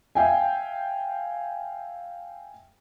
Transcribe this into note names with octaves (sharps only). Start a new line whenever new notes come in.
E5 F5 G5 G#5